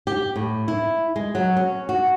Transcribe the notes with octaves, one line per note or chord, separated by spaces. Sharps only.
G4
A2
E4
G#3
F#3
C#4
F#4